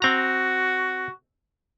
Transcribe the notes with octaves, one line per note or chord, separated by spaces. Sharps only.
C4 F#4 A#5